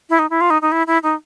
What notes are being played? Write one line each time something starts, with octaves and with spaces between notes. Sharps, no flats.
E4
D#4
E4
F4
D#4
D#4
E4
E4
D#4